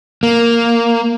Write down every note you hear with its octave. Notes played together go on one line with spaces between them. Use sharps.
A#3